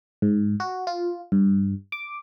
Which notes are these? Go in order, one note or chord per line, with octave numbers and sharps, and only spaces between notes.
G#2
F#4
F4
G2
D6